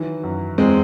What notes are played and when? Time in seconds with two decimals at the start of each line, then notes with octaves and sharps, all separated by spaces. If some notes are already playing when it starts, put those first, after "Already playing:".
Already playing: D#3 E3 F#3
0.24 F#2
0.58 E2 G#3 C4